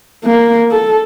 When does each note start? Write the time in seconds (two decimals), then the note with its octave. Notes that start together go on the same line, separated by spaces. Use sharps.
0.24 A#3
0.71 A4